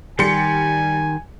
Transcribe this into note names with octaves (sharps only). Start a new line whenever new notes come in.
D#3 G3 G4 G#5 C6 C#7